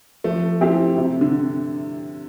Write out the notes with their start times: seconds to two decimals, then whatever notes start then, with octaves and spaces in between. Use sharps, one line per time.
0.24 F3 A3
0.61 A3 C4 E4 G4 C5
0.98 C3
1.21 D3